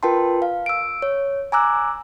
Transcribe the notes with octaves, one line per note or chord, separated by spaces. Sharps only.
F4 A#4 B4 G5 A5 C6
F5
E6 D7
C#5
G#5 A#5 D6 E6 F#6